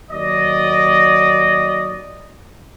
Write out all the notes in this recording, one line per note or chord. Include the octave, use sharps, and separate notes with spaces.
D#2 F#3 D5 D#5